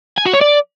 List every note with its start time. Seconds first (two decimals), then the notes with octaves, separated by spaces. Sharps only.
0.18 G#5
0.26 F#4
0.34 C#5
0.41 D5